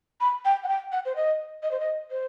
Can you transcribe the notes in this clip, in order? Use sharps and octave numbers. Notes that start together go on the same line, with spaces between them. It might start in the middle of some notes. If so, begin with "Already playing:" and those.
B5
G5
F#5
G5
F#5
C5
D#5
D#5
C5
D#5
C5